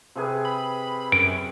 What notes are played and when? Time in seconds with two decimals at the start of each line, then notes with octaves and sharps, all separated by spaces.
0.15 C3 G#4 B4
0.45 B5
1.12 F#2 D7